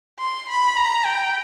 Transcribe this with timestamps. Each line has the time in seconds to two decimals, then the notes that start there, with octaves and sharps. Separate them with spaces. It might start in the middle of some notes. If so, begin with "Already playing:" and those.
0.19 C6
0.48 B5
0.77 A#5
1.05 G5